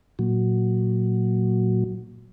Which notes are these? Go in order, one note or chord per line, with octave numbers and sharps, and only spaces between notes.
A#2 F#3